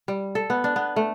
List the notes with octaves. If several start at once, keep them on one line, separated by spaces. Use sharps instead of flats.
G3
A4
B3
D4
B3
A3